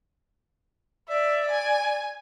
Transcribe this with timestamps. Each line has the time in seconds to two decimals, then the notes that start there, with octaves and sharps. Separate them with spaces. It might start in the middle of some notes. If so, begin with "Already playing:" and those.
1.09 D5 E5
1.51 G#5